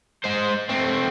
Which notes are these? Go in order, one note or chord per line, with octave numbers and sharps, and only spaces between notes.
G#3 C5
A3 C4